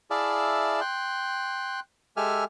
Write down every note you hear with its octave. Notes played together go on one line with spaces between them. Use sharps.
E4 G#4 D5 E5 F5 A5
G5 C6 F#6
G#3 G4 A4 E5 G#5 F6